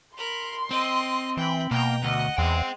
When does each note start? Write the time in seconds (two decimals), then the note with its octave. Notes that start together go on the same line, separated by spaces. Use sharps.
0.17 A#4 B5 C6
0.71 C4 D#5
1.37 E3 G5 B5
1.71 B2 A#3 G5 A#5
2.04 D2 D#5 F#5
2.38 E2 G#3 C5 G5